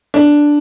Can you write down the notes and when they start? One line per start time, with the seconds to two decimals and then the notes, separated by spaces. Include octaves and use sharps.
0.14 D4